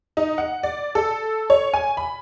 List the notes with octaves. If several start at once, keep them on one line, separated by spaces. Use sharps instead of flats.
D#4
F#5
D5
A4
C#5
G#5
B5